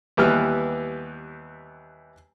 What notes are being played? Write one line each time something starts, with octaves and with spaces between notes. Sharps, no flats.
D#2 E3 G3 B3 F6